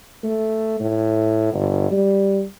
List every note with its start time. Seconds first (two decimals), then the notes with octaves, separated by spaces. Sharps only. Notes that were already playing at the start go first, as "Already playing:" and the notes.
0.23 A3
0.80 A2
1.53 G1
1.91 G3